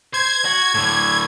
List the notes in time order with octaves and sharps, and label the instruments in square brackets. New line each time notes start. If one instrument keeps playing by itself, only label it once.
[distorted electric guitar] C5 [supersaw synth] G#6
[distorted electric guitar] F#4
A2 D3